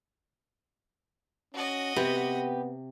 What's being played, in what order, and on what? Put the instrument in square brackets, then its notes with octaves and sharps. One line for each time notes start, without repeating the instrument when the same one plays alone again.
[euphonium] C#4 [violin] F#4 D#5
[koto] C3 [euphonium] B3 [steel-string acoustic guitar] G4 B4